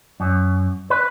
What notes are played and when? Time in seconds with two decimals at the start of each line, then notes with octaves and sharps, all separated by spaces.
0.20 F#2
0.90 B4